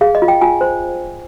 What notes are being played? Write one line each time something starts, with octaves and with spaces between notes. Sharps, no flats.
G#4 F5
D#5
F4
G5
F4 G#5
C5